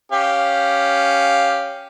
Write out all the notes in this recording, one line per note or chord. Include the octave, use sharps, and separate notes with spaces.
C#4 G4 F5